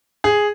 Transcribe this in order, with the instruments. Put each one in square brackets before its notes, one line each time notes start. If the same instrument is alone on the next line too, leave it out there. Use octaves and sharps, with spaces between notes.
[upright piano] G#4